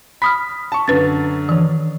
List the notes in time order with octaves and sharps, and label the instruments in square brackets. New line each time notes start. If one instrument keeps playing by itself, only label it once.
[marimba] B5 D#6 F6 [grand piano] B6
[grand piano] A5 C#6
[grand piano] F#2 D3 [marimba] B4 A6
[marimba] D#3 E3